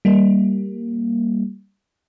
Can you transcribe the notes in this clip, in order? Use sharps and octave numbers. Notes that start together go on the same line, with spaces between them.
G3 A#3